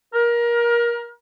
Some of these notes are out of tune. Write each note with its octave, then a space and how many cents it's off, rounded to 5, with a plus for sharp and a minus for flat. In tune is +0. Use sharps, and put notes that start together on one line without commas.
A#4 +25